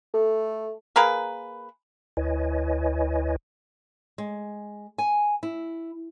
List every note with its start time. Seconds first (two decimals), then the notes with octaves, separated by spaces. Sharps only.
0.14 A3 A4
0.96 A#3 G#4 A#4 B4
2.17 D2 E4 B4 C#5 D#5 G#5
4.18 G#3
4.98 G#5
5.43 E4